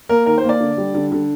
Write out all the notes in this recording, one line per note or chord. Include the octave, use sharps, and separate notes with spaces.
A#3 A#4
D#3 A#4
C5
A#3
D5
D3
G3
D3
D3